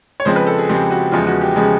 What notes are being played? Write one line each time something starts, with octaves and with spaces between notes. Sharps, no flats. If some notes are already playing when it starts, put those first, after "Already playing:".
C#5
C#3 F3 G#3 C4 C5
B4
A4
G#4
C#3 F3 G#3 C4 G4
F#4
E2 C#3 F3 G#3 F4
F#4
G4
C#3 F3 G#3